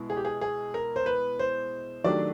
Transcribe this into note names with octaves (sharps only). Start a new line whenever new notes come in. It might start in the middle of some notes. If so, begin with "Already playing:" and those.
Already playing: B2 G#3 E4
G#4
G4
G#4
G#4
A#4
C5
B4
C5
D#3 F#3 A3 D4 G4 D5